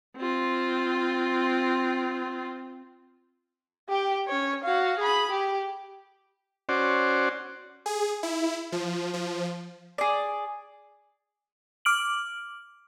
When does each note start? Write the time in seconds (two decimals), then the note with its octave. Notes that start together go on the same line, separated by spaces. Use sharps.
0.17 C4 F4
3.89 G4 G5
4.28 C#4 C#5
4.64 F#4 F5
4.99 G#4 B5
5.31 G4
6.69 C#4 F#4 C5 D5
7.86 G#4
8.23 E4
8.72 F3
9.14 F3
9.98 G#4 D5
11.85 D6 F6 D7 F#7